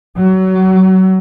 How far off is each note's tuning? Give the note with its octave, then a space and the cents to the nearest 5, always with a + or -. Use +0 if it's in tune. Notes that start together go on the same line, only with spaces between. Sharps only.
F#3 +25